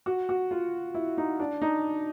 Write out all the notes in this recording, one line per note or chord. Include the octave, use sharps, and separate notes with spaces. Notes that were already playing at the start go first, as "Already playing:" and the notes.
F#4
F#4
F4
E4
D#4
D4
D#4